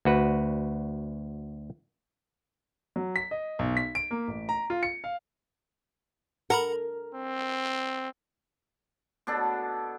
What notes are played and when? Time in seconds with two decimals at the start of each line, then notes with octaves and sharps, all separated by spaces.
0.05 D2 F#4 B4
2.96 F#3
3.16 B6
3.31 D#5
3.59 B1
3.77 B6
3.95 D7
4.11 A#3
4.28 A1
4.49 A#5
4.70 F4
4.83 C#7
5.04 F5
6.50 A#4 F#5 A#5 B5
7.15 C4
9.27 B2 D4 A4